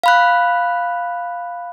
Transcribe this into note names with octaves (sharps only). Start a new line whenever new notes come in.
F5 B5 F#6